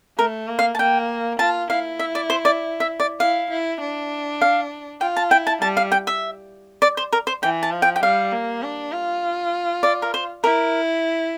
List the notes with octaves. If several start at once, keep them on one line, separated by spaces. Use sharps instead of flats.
A3 A#4
A#3
F5
A5
A#3 G5
F4 A5
E4 F5
E5
D5
C5
D5
E5
D5
E4 F5
E4
D4
F5
F4 G5
A5
E4 G5
A5
G3 A5
F5
G5
E5
D5
C5
A#4
C5
E3 G5
A5
F3
G5
G5
G3 F5
A#3
D4
F4
D5
A#4
C5
E4 A#4